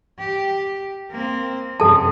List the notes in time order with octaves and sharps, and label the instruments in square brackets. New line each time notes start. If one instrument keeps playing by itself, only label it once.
[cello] G4
A#3 C4
[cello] F#2 C3 [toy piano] A4 A5